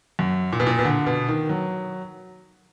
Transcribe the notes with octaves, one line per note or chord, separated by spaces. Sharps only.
F#2
A#2
B2
A#2
B2
D3
B2
D#3
F#3